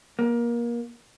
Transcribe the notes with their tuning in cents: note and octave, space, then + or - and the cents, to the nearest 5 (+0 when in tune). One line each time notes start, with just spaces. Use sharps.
A#3 +25